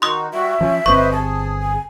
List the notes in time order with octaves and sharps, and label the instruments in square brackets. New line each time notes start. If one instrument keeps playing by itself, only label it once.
[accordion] D#3 D#4 F#4 [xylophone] C6 D#6
[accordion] G3 F#4 [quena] E5
[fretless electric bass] F3 [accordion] C#4
[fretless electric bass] G1 D3 C4 [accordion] B4 C5 D#5 [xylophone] C#6
[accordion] G#4 [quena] A5
[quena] G#5